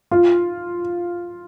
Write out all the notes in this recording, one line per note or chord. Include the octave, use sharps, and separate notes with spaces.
F4